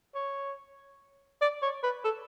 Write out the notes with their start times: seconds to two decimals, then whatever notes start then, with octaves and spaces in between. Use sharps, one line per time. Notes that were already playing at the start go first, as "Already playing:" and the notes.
0.15 C#5
1.41 D5
1.62 C#5
1.83 B4
2.04 A4